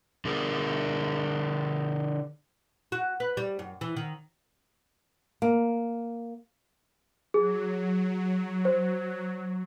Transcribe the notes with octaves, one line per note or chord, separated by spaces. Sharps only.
D3 G#4 A#4
F#4
B4
G3
F#2
E3
D#3
A#3
F#3 G#4
C5